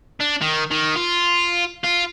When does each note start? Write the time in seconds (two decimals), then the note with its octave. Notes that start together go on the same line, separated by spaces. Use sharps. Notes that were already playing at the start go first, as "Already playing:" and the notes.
0.21 D4
0.41 D#3
0.71 D#3
0.96 F4
1.84 F4